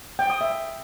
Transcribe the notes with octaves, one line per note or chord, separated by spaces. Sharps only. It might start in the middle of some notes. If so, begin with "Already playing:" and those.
G5
D#6
E5